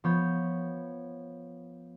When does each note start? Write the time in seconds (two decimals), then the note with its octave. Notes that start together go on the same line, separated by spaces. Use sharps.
0.04 F3 B3 C#5 G6